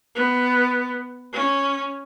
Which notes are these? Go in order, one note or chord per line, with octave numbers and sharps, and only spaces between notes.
B3
C#4